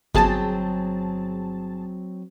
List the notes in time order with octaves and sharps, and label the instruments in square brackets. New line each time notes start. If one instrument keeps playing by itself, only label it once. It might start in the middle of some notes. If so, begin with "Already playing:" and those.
[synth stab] G1 G#4 A5 [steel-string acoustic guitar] F#3 C4